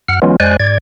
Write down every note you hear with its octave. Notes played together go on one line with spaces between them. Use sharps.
F#2 F#5 F6
E3 F#3 G#3 B3 C#4 F4
F2 G#3 C5 D5 G#5 F#6
G#2 D5 G#6